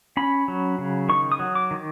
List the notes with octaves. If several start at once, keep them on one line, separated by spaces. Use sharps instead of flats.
C#4 B5
F#3
C#3
D#3 C#6
D#6
F#3
D6
D#3